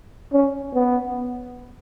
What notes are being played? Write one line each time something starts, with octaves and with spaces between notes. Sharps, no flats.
C#4
B3